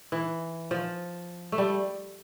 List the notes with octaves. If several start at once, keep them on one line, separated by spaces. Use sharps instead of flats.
E3
F3
A3
G3